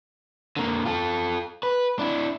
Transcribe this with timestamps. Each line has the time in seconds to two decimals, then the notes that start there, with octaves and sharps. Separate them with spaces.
0.57 D3 A#3
0.86 F4 A4
1.63 B4
1.99 D4 E4